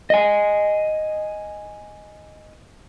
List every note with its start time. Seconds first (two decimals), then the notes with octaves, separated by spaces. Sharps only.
0.10 D#5 G#5